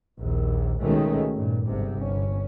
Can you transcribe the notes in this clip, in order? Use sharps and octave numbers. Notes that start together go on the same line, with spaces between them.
A#1 D#2
C#2 B2 D#3 G#3 A3 C#4
G2 A#2
G1 C2 G#2 C3
G1 C#4